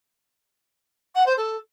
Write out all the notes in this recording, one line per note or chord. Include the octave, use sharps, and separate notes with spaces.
F#5
C5
A4